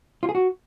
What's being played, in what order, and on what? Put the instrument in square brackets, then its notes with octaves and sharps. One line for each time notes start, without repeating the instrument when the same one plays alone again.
[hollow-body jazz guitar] F4
G#4
F#4